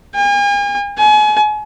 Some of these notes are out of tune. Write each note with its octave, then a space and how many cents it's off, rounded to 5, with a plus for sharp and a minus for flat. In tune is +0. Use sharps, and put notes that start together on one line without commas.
G#5 -40
G#5 +35